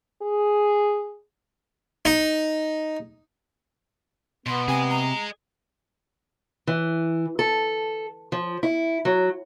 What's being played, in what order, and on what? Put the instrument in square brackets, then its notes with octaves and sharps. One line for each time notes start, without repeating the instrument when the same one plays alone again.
[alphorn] G#4
[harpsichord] D#4
[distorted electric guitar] B2 [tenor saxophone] B3 [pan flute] C6
[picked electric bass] C3 [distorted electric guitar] G#4 D#5 [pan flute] G#5
[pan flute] A#5
[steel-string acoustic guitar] E3
A4
F3
E4
F#3